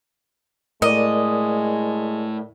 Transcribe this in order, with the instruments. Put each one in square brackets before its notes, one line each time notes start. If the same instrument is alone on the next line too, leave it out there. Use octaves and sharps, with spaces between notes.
[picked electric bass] A2 [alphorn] G#3 [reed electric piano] A#4 D5 [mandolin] D#5